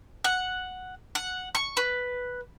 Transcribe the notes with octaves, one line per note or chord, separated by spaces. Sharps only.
F#5
F#5
C#6
B4